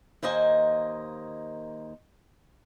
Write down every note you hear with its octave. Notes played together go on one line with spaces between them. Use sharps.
D#2 A#3 C5 D#5 G#5